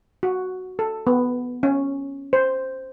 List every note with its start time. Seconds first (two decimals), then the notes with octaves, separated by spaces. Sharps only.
0.23 F#4
0.79 A4
1.07 B3
1.63 C#4
2.33 C5